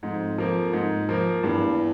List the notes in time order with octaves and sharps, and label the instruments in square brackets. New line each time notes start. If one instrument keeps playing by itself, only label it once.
[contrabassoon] F2 [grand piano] G#2
[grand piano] F3 A#3
G#2
F3 A#3
[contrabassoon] E2 [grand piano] G2